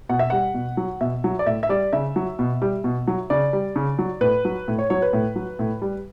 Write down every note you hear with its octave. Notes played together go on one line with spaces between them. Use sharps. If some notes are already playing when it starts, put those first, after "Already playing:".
B2 F#5
E5
G3 F#5
B2
F#3
B2 E5
F#3
D5
A2 E5
E5
G3 D5
C#3 E5
F#3
B2
G3
B2
F#3
C#3 D5
G3
C#3
F#3
A2 B4
F#3
A2
C#5
F#3 C#5
B4
A2
F#3
A2
G3